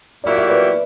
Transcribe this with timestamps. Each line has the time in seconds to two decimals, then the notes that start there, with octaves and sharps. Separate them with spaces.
0.24 A#2 F#3 A#3 E4 G4 D5
0.36 E5
0.49 B4 D5